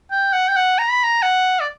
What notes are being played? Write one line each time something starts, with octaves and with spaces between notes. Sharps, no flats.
G5
F#5
G5
F#5
A#5
B5
A#5
F#5
D5